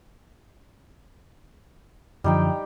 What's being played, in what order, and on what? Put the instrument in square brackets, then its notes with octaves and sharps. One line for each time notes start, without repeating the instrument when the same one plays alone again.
[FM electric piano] F#2 D3 F3 [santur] G3 D#4 G5